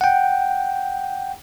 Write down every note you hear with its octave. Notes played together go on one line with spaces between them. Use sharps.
F#5 G5